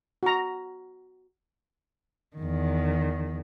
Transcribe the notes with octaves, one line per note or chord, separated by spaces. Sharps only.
F#4 A#5
E2 D#3